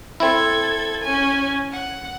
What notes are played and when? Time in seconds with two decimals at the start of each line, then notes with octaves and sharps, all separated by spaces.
0.20 C4 E4 A4 G#6
1.02 C#4 G#5
1.72 F#5